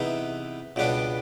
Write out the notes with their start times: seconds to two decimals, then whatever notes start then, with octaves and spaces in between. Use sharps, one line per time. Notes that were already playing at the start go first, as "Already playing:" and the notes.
Already playing: C3 E3 G#3 B3 D#4
0.76 C#2 B2 G3 B3 D4